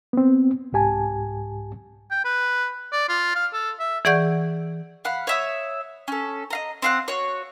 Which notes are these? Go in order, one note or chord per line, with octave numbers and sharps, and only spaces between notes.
B3 C4
C2 G#2 G4 G#5 A5
G5
B4
D5
F4
F5
A4
E5
E3 G#4 D5 F#5 C#6 G6
F5 F#5 B5
C#5 E5 D#6
C#4 A4
D#5 F5 A#5
C4 F5 F#5
F#4 C#5